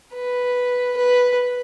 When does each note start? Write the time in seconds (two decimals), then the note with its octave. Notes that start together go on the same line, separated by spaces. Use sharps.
0.14 B4
0.97 B4